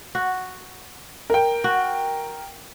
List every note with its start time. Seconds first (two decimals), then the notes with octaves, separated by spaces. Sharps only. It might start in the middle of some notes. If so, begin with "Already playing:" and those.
0.15 F#4
1.30 A#4 G5
1.64 F#4